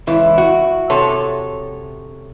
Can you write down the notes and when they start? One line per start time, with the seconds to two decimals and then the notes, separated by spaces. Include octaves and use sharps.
0.07 C#2 E3 E4
0.38 F#4
0.90 C3 A4 C#5